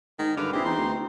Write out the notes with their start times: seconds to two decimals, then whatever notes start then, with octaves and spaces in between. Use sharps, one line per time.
0.19 G#2 D#3
0.37 G2 D3 B4 D6 F6
0.53 A#1 C4 E4 G4 G#4
0.65 E2 D#4 C6
0.78 D2